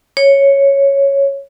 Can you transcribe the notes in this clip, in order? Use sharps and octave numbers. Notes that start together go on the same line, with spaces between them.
C#5